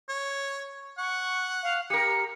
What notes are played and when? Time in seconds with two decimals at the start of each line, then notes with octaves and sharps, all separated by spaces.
0.09 C#5
0.98 F#5 C#6
1.63 F5
1.90 G4 A#4 C#7